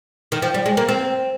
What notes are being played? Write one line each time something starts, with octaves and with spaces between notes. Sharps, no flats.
D#3
F3
G3
G#3
A#3
C4